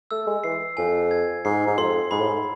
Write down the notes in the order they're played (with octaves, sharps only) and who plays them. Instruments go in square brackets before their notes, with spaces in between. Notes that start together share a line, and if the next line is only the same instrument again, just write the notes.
[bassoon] A3 [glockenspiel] E6
[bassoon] G#3
[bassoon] E3 [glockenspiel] C7
[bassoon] F2 [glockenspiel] G#5
[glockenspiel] G#6
[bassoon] G#2 [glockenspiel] C7
[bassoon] G#2
[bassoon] F2 [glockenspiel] C6
[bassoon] G#2 [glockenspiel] B5
[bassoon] A2
G#2